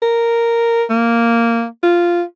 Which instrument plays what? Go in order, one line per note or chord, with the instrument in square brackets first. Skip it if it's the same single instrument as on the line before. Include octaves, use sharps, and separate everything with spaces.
[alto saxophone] A#4
A#3
F4